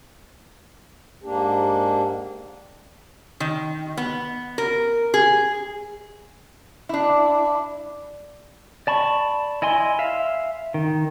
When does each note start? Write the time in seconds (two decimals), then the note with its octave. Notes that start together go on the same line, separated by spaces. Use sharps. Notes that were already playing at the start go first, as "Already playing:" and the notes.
1.24 G#2 A#3 D4 G4
3.40 D#3
3.97 B3
4.58 A#4
5.14 G#4
6.89 D4 E4
8.87 D5 A5 B5 C#6
9.62 E4 D#5 G#5 C6
9.99 E5 F5
10.74 D#3